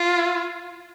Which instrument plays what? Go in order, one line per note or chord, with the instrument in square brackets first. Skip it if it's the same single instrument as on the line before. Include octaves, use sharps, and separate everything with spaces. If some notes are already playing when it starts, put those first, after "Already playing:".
Already playing: [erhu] F4